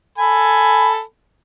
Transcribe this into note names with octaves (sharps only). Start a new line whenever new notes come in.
A4 G#5 B5